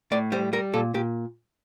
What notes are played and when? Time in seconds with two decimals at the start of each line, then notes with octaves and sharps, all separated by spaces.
0.12 A2 D5
0.32 G3 C5
0.53 G3 A#4
0.73 A#2 A4
0.94 A#2 G4